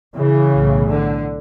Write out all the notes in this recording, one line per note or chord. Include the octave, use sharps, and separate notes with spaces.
C#3 E3
B1 A2
D3